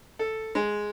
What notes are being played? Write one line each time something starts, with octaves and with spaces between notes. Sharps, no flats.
A4
G#3